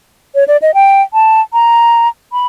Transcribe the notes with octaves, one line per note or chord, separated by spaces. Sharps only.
C#5
D5
D#5
G5
A5
A#5
B5